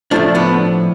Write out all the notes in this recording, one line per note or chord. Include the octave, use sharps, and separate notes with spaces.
A2 F3 A3 D4 F4
B3 D4